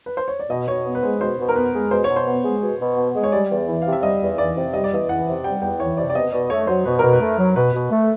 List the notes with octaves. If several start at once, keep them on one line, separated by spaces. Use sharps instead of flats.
B4
C5
C#5
D5
B2 D#5
B2 C#5
B3
B4
G#3 C5
B2 C5
B2
A#4
B3 B4
G#3
B2 C5
B2 C#5
C5
B3
G#3
B2
B2
B3
G#3
C#5
G3 D5
E2
E3
C3 F5
E5
G3 D#5
E2
E3 D5
C3
G3 D#5
D5
E2 D#5
E3 F#5
C3
G3 G5
E2 G5
E3 C#5
C3 D5
D5
B2 D#5
B2 D5
A3 C#5
F#3 C5
B2 B4
B2 A#4
B4
A3
F#3
B2 B4
B2
A3